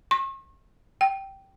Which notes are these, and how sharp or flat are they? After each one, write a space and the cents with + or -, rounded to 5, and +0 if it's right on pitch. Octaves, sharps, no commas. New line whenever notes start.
C#6 -45
G5 -10